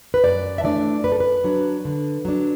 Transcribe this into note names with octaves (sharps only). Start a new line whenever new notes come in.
B4
F#2 D5
E5
E3 A3 D4 D5
F#2 B4
A4
B4
F#3 D4
D3
F#3 D4